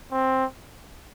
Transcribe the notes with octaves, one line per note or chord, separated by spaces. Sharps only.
C4